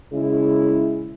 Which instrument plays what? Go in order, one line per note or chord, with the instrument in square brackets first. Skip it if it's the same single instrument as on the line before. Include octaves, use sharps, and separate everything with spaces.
[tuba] C#3 [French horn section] G#3 E4